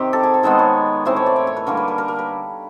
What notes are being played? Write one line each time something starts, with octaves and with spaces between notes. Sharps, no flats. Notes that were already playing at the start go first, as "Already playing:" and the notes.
Already playing: C3 D#3 C4 G4
A4
G#4
A4
D#3 G#3 B3 C5
C#5
A2 E3 A3 C4 C5
C#5
D5
C#5
C#5
B4
D3 G3 A#3 A#4
B4
A#4
A#4
A#4
B4